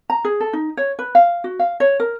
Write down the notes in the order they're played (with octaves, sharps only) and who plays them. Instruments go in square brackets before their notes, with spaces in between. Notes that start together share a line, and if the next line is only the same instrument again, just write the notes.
[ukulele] A#5
G#4
A4
D#4
C#5
B4
F5
F#4
F5
C#5
A#4